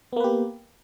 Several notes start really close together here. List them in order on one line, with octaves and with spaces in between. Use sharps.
B3 A#3 B4 G4